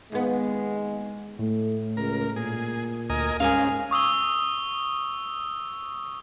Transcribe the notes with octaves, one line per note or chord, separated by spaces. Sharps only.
D#2 G#3 B3
A2 A3
C#2 A#4
A#2 G#4
D2 A#4 D#5 G#5
G#2 C#4 G#4 A#4 F5
C#6 D#6 E6 G7